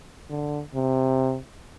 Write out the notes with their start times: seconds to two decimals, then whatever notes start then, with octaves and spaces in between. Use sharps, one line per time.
0.30 D3
0.74 C3